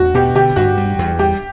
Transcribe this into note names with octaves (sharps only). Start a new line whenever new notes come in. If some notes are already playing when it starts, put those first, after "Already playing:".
Already playing: E2 F#4
B2 G4
D3 G4
G2 F#4
G3
E2
G3 G4